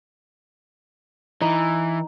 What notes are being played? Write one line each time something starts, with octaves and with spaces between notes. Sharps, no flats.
E3 D#4